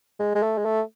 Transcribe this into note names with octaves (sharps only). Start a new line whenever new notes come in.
G#3
G#3
A3
G#3
A3